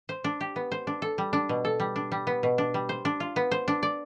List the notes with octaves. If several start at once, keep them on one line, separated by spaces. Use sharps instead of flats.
C5
D4
G4
B3
C5
D4
A4
G3
D4
B2
A4
G3
D4
G3
B3
B2
D4
G3
C5
D4
F4
B3
C5
D4
D5